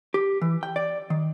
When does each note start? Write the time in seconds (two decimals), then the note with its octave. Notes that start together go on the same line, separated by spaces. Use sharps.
0.14 G4
0.42 E3
0.63 G5
0.76 D5
1.10 D#3